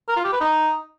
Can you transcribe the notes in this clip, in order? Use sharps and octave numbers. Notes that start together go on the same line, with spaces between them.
A#4
F4
G4
B4
D#4